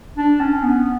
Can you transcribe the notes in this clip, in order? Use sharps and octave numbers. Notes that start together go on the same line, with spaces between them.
D4
C#4
B3